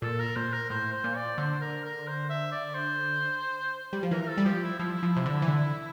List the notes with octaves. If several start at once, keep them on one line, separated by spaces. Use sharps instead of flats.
A#2 A4
A#4
A#2 C5
A#4
A2 C5
C5
A#2
D5
D3 C5
A#4
A#4
C5
E5
D5
C5
G3
F3
E3 A#4
A#4
A4
G3
F3 G4
E4
F3 E4
F3
C3
D3
E3
D3